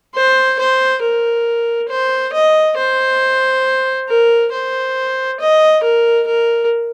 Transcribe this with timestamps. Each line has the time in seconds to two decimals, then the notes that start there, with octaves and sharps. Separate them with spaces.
0.15 C5
0.59 C5
1.02 A#4
1.90 C5
2.34 D#5
2.78 C5
4.09 A#4
4.52 C5
5.40 D#5
5.84 A#4
6.27 A#4